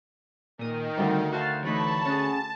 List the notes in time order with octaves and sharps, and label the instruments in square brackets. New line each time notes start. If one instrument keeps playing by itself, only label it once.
[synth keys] A#2 D#6 [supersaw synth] D#3 [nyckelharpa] A#4
[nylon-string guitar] D2 [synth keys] G3 C4
[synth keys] F#4 C5 A5 [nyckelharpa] F5
[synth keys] E3 A3 D#4 [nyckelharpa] C#5 B5 [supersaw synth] A5
[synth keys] C#4 F#4 G#4